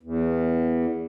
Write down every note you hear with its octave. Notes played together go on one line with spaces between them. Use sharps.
E2